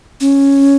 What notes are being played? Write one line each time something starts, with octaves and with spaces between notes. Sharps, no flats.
C#4